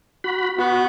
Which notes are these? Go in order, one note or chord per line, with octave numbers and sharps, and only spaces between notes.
F#4 B5
B3 F#4